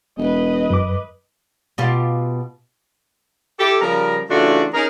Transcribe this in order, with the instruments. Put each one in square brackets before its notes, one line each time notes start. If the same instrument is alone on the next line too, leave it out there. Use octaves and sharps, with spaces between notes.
[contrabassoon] E1 [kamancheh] B4 D#5
[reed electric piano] F#2 D6
[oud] B2 F4 G4
[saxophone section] E4 G4 A4
C#3 F3 G3 A#4
C#3 E3 A3 D4 F4 F#4
C#4 D#4 G#4 A#4